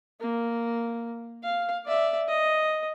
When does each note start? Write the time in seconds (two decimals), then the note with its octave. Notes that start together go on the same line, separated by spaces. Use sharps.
0.20 A#3
1.43 F5
1.86 D5 E5
2.28 D#5